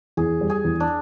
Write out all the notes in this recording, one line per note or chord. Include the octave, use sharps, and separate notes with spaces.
E2 G#4
G3
G#4
E2
D4